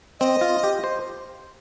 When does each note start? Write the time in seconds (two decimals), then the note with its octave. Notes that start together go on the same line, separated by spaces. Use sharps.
0.20 C4 D#5
0.41 F4
0.64 G4
0.84 C5